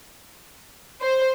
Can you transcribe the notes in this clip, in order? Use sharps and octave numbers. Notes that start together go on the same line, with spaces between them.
C5